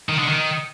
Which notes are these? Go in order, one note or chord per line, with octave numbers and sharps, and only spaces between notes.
D#3
D3
D#3